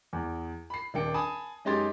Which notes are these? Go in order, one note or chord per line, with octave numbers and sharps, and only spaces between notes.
E2
B5 C7
D#1 D4 G5 C#7
G#5 A5 B5 D#6
F#2 G#3 D#4 G4 C6 A6